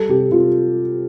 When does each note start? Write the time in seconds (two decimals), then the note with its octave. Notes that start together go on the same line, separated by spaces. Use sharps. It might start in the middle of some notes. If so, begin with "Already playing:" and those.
Already playing: G3 A4
0.09 C3 G4
0.32 C3 F4